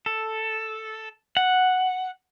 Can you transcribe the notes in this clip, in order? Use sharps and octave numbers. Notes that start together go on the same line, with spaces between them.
A4
F#5